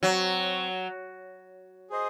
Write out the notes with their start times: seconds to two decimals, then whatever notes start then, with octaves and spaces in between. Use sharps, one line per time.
0.02 F#3 C4 F#4 C#5
1.90 G#4 C5 D#5